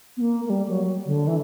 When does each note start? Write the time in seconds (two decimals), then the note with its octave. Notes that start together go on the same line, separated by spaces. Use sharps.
0.17 B3
0.21 A#3
0.45 A#3
0.50 G3
0.69 F#3
1.06 D3
1.27 E3